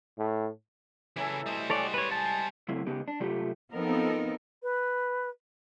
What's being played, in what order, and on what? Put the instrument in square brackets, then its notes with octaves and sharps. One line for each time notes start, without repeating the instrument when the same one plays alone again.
[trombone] A2
[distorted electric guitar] C#3 E4 [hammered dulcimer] E3 F#3 A4
[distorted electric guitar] G3 C5 [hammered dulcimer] A3 D#5
[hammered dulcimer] G#3 G4 F#5 [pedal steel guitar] A4 C#5 D5
[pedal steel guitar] B4 C#5
[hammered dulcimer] G#5 [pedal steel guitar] A5
[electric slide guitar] C#3 F#3 A3 C4 E4
C#3 B3 D#4 G4
D4
C3 F#3 A3 F4 G4
[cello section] F3 B3 C4 D#4 A4 A#4
[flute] B4